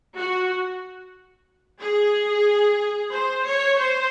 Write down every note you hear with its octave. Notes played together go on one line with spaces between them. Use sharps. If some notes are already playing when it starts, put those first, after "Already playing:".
F#4
G#4
C5
C#5
C5